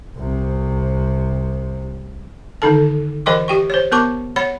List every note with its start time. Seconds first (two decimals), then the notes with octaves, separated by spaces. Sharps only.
0.17 C2 C3
2.62 D3 D#3 D#4 A4 A5
3.26 E3 A#4 D#5 G5 C6 D6
3.48 G4 G5 C#6
3.70 C5 C#5
3.92 B3 A#4 A5 C#6 D6
4.36 C#5 F#5 B5